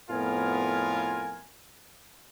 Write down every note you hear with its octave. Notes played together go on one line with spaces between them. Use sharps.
F2 A2 B3 F4 A#4 G#5